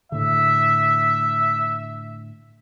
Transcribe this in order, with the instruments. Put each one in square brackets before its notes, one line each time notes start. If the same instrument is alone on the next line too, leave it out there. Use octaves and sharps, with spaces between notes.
[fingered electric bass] A2 D3 [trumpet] E5